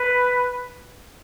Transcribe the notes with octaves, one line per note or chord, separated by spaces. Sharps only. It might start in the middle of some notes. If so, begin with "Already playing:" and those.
Already playing: B4